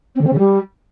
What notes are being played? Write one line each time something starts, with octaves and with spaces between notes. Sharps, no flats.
C4
D3
C4
C#3
G3